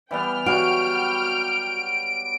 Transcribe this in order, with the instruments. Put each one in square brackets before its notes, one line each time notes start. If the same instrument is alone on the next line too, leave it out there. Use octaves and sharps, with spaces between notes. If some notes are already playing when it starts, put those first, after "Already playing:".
[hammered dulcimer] E3 G3 B3 [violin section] G5 F6
[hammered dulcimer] F#3 G3 F5 [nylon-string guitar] F#4 [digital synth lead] D7